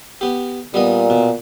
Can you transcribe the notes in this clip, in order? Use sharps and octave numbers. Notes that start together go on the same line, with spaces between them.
B3 G4
A#2 G3 B3 D#5
B2